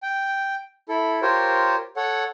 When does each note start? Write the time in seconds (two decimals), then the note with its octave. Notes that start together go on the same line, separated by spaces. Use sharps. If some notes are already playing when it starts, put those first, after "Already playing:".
0.03 G5
0.89 E4 A4
1.22 F4 G4 A#4 C5 C#5
1.97 A4 C#5 F#5